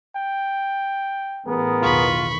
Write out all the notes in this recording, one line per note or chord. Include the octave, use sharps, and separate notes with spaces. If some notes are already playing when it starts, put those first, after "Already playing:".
G5
A1 B3 G#4 A#4
B1 E2 D#3 F4 B5 C#6